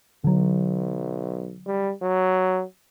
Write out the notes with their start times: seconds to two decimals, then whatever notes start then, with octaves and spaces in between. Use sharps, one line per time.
0.24 B1 D3 F#3
1.67 G3
2.02 F#3